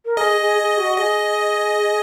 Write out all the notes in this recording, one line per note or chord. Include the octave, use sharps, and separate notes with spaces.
A#4
G#4 D#5
G#4
G#4
F#4
G#4 D#5